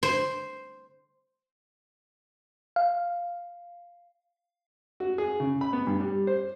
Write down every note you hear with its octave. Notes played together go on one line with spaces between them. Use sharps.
C5
F5
F#4
G#4
C#3
B5
B3
G2
G3
C5